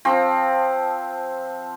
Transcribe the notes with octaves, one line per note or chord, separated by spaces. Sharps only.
F3 C4